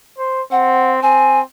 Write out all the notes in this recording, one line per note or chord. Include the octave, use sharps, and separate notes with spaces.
C5
C4 F#5
C4 G#5